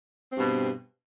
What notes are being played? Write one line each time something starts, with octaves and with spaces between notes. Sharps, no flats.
G2 B2 C4